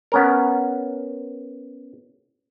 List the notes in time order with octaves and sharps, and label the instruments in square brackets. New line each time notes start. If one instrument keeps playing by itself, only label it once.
[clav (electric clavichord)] B3 C#4 A#4